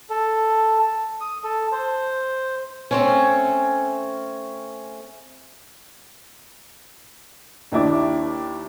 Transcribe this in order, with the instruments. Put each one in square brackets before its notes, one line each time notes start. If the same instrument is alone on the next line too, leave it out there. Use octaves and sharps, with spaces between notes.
[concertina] A4
D#6
A4
C5
[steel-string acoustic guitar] A3 C4 C#4
[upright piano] D#2 D4 E4 D6